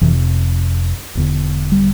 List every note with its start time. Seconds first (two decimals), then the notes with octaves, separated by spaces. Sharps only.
0.01 F1 F2 C3 E3
1.15 E1 E2 D3
1.72 G3